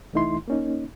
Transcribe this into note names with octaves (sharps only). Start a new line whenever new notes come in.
C2 E3 A3 D#4 E4 C6
A#3 C#4 D#4